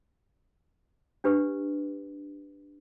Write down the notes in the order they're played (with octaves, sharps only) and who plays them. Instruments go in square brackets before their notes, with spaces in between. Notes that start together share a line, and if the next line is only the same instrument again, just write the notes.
[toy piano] D4 G4 B4